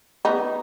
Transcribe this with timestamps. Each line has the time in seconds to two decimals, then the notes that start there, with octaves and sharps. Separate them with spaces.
0.25 B3 D#4